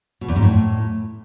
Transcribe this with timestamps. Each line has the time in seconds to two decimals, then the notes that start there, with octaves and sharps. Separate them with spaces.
0.21 B2
0.28 E2
0.35 G#2
0.43 A2